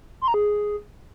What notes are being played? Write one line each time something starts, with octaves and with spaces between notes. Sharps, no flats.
C6
A#5
G#4